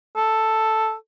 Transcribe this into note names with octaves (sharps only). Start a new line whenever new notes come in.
A4